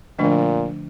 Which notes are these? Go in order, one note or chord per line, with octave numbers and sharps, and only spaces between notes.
A#2 D3 F3 A3 D4